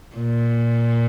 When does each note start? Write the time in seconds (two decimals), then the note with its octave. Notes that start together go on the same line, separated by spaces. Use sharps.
0.16 A#2